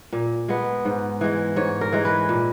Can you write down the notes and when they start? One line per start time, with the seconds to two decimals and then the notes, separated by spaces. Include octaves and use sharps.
0.13 A#2
0.48 G#3 B3
0.85 G#2
1.21 E3 G#3
1.56 G#2 C#5
1.81 A#4
1.92 E3 G#3
2.05 B4
2.29 A#2